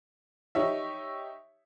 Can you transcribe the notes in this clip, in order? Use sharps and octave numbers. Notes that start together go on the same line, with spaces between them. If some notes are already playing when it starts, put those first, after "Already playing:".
D#4 G4 C#5 E5